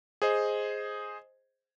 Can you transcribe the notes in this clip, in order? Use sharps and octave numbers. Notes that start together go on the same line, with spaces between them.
G#4 C5 D#5